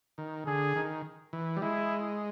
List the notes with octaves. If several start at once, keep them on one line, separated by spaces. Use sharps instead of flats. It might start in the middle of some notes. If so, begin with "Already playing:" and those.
D#3
D3 G#4
D#3
E3
G3
G#3 E4